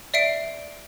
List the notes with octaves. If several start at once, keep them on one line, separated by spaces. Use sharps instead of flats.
D5 E5 C7 D7